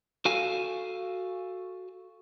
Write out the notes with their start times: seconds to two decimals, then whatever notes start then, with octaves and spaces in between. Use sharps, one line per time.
0.25 F#4 A4 F5 G#5